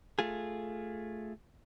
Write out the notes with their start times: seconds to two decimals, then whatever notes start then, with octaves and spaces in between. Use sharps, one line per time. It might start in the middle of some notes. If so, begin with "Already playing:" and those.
0.19 A3 F4 G#4